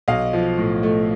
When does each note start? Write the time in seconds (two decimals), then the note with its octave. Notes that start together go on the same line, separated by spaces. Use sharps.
0.08 B1 D#5 F5
0.33 F3
0.58 A2
0.83 A3